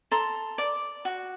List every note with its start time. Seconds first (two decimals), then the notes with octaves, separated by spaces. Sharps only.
0.11 A4 A#5 C6
0.58 D5
1.05 F#4